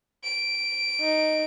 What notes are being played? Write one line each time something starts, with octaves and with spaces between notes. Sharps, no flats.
D7
D#4